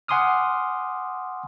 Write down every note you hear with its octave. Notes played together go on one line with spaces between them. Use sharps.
F#5 G#5 C6 D6 D#6 F6